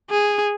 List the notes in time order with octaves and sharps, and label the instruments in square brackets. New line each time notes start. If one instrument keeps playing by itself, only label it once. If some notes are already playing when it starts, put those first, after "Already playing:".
[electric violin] G#4